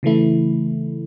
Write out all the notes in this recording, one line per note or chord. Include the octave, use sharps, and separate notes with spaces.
C#3 E3 A3 E4